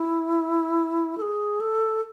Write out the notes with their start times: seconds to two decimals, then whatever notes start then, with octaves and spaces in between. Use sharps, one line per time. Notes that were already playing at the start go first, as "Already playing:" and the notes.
Already playing: E4
1.18 A4
1.22 G#4
1.60 A4